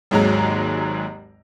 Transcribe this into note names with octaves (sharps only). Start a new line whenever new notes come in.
G#1 D#2 G#2 F#3 G#3 A#5